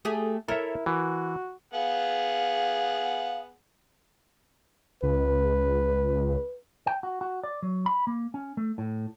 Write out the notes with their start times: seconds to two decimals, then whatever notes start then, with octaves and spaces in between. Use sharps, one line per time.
0.05 A3 G4 G#4
0.48 E4 A4 A#4 C#5 E5
0.86 E3 F#4
1.74 B3 G#4 F5 F#5
5.03 C#2 B4
6.87 G5
7.03 F#4
7.21 F#4
7.43 D5
7.62 F#3
7.86 B5
8.07 A#3
8.34 C#4
8.57 A3
8.78 A2